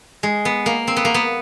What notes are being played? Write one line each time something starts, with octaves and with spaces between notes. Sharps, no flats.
G#3
B3
A#3
C4
B3
A#3
B3